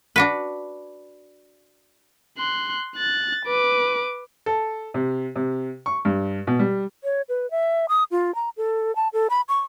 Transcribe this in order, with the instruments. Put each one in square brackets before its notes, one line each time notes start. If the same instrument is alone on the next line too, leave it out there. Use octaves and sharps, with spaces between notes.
[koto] D4 F#4 B4
[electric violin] C6 F#6
F#6 A6
B4 D6
[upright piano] A4
C3
C3
C#6
G2
B2
G3
[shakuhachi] C#5
B4
E5
D#6
F4
A#5
A4
A5
A4
B5
C#6